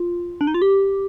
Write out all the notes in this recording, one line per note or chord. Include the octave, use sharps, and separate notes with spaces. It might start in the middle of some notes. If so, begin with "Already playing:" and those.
Already playing: F4
D4
D#4
F4
G4